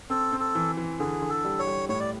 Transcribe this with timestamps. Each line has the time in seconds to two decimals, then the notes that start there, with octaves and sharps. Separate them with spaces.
0.10 C4 A4
0.32 C4
0.40 A4
0.55 E3
0.77 E3
0.99 D3 G#4
1.22 D3
1.29 A4
1.45 G3
1.59 C#5
1.67 G3
1.89 A2 C#5
2.00 D5